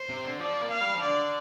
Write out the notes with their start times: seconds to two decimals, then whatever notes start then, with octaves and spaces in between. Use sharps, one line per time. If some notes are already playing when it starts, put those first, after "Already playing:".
Already playing: C5
0.09 C3
0.24 D3
0.39 F3 D5
0.60 A#3
0.70 F5
0.81 G3
0.94 F3
1.02 D3 D5